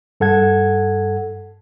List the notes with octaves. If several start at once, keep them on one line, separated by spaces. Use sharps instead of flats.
G2 A4 F#5 G#6